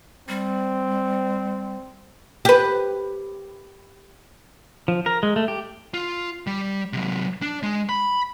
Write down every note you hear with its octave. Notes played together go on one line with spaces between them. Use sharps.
G3 C4
G4 B4
F3
A#4
G#3
A3
G4
F4
G3
C3 F#3
D4
G#3
B5